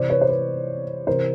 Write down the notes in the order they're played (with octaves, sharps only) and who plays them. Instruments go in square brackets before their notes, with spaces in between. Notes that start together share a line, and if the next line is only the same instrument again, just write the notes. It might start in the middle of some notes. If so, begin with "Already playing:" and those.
Already playing: [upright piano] C3 E3 C5 D5
B4 C#5
C5
B4
C3 E3 A#4 C5